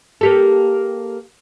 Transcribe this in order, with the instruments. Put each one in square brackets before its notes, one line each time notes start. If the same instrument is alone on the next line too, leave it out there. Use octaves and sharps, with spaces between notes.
[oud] A#3 G4 A4